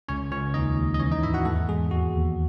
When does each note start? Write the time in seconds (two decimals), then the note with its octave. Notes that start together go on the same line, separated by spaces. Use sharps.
0.08 C#2 C#4 C#5
0.32 C#2 C#4 C#5
0.54 D#2 D#4 D#5
0.77 D#2
0.94 D#5
1.00 E3 C#4 C#5
1.11 D#4 D#5
1.23 G#2 E4 E5
1.34 F#4 F#5
1.45 E2 A3 A4
1.68 E2 G#3 G#4
1.91 D#2 F#4
2.14 D#2